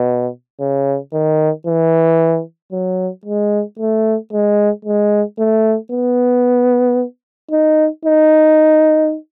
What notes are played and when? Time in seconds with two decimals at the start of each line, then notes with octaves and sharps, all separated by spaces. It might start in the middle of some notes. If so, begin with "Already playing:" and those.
Already playing: B2
0.60 C#3
1.13 D#3
1.67 E3
2.72 F#3
3.25 G#3
3.79 A3
4.33 G#3
4.85 G#3
5.39 A3
5.92 B3
7.52 D#4
8.05 D#4